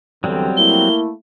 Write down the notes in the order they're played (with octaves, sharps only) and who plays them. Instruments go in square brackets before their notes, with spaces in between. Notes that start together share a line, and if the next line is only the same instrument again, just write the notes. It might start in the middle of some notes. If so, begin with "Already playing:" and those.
[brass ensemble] E2 D3 E3 [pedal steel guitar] F#3 G3 C4
[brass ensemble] A3 A#3 E4 [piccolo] G7